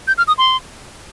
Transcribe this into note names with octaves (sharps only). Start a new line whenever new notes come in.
G6
F6
D#6
C6